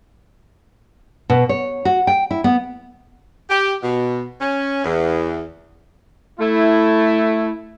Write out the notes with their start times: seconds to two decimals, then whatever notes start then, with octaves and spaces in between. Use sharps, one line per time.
1.30 B2
1.49 C#5
1.85 F#4
2.07 G5
2.31 E4
2.44 B3
3.50 G4
3.83 B2
4.41 C#4
4.84 E2
6.39 A3 E4